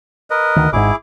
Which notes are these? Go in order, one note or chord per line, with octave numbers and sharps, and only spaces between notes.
A#4 B4 D#5
D2 D#3
G#1 G#2 E4 G#4 D6